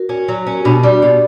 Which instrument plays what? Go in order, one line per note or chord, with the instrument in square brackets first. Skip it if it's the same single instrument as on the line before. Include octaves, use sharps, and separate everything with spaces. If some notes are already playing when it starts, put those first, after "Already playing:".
Already playing: [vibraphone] F#4 A#4
[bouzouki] C#4
F#3
C#4
[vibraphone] G4
[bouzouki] B2 [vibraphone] D4 F#4
[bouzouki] G3
B2